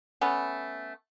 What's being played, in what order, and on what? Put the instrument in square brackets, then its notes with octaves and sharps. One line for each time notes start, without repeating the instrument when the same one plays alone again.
[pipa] A3 B3 C#4